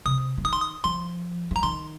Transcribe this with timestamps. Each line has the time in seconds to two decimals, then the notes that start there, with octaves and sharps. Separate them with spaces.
0.05 C3 D#6
0.37 F3
0.44 D#3 D#6
0.53 C6
0.60 D#6
0.84 F3 C6
1.51 F3 A#5
1.63 D#3 C6